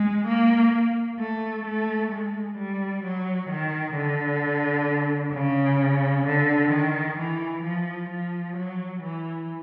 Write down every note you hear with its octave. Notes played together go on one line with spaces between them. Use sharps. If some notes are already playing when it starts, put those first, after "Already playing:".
Already playing: G#3
A#3
A3
A3
G#3
G3
F#3
D#3
D3
C#3
D3
D#3
E3
F3
F3
F#3
E3